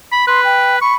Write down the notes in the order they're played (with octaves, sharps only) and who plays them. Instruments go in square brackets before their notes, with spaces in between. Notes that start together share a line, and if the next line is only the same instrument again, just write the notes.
[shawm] B5
[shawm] B4 [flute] C6
[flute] G5
[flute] B5 [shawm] C#6